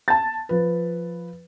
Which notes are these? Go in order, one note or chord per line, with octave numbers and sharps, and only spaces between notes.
A5 A6
F3 B4